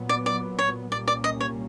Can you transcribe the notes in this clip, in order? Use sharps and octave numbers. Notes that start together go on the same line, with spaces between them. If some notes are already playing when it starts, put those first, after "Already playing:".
Already playing: A#2 F#3 B3
D5
D5
C#5
C2 A#2 G3 A#3 C#4 D5
D5
D#5
C#5